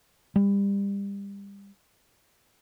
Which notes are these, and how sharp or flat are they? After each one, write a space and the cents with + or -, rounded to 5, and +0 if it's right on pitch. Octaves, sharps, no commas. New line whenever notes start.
G3 +30